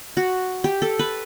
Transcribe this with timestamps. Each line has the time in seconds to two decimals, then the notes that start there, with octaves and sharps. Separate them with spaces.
0.17 F#4
0.64 G4
0.82 A4
0.99 B4